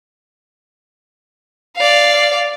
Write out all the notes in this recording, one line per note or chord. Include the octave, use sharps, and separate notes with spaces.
D5 F5